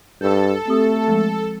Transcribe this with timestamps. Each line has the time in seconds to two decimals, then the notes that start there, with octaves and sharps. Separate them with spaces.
0.21 G2 A4 G6
0.68 A3 C4 G4 D#6
1.08 F3 G#3